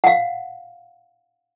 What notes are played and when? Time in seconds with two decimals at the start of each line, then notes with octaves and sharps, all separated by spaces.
0.04 F5 F#5